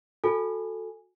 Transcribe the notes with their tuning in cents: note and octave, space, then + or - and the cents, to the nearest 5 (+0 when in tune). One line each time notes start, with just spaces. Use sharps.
F#4 -20 A4 +0 G#5 -5